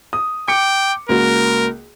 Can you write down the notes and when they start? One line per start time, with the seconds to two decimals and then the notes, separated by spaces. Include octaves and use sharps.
0.13 D#6
0.48 G5 D6 C#7
1.09 C#2 A#3 F#4 A#4